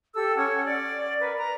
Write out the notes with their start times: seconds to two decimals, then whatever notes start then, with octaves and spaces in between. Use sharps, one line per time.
0.14 G4 A4 E6
0.36 C#4 C#5 F#5
0.65 D5
1.19 A#4 B4
1.37 A#5